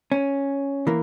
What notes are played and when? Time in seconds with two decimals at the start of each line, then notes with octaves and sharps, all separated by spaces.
0.12 C#4
0.87 E3 A#3